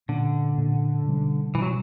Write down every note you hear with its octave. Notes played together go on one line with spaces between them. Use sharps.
A#2 D3 A#3 C#4
A#2 A#3 C#4
B2 G3 C#4
B2 E3 G3 C#4
F#3